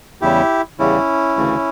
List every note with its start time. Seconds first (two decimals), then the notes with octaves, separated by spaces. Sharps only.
0.21 E2 C#3 G3 E4 G4
0.79 E2 C#3 G3 C#4 E4
1.37 D2 C#3 E3 A3